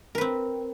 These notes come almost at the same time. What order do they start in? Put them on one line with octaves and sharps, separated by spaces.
A#4 B4 C4